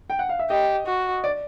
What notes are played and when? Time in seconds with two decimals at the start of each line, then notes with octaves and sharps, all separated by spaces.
0.10 G5
0.19 F#5
0.29 F5
0.39 E5
0.50 G4 D#5
0.86 F#4
1.24 D5